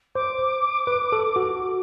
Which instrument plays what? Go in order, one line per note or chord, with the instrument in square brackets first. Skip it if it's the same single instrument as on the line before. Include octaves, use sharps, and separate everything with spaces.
[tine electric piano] C5 [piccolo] D6
[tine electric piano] B4
A4
F#4